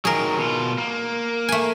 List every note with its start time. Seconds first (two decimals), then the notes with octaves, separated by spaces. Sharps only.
0.05 D#3 F#3 G#4 A#4
0.38 B2 F4
0.78 A#3
1.49 A3 G#5